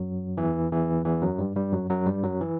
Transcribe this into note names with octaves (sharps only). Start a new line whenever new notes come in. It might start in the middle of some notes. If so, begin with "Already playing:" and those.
Already playing: F#2 F#3
E2 E3
E2 E3
E2 E3
F#2 F#3
G2 G3
G2 G3
F#2 F#3
F#2 F#3
G2 G3
F#2 F#3
E3